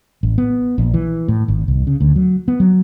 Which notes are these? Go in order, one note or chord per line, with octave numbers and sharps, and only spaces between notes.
A1
B3
A#1
E3
A2
G#1
C2
C#3
D2
F#3
B3
F#3